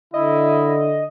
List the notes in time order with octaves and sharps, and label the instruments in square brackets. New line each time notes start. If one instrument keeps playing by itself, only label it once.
[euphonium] D3 [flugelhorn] E4 [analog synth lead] D#5